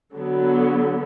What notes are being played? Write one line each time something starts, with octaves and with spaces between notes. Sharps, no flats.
D3 F#3 B3